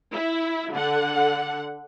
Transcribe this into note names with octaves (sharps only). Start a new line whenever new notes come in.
E4 E5
D3 F#5